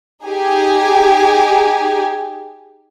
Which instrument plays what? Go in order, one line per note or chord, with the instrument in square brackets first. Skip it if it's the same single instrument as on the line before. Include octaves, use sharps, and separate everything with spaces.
[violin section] D#4 G4 G#4 G#5